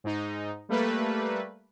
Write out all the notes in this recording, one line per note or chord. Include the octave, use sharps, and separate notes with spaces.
G#2 D#4
G3 A3 A#3 B4